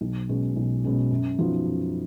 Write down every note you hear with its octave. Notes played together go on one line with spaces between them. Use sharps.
B1
B2 G#3 C#4
B1
B2 G#3 C#4
F#2
F3 B3 D#4 F#4
F#2